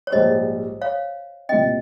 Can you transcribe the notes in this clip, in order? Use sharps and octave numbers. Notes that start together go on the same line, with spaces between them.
C#5
A#1 G#2 G3 C5 D#5
C#5 F5
C2 A#2 G3 C4 D#5 G5